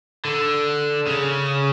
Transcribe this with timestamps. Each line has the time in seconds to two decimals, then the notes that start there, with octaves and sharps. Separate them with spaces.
0.25 D3
1.08 C#3